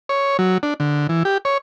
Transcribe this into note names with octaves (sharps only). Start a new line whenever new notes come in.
C#5
F#3
D4
D3
E3
G4
C#5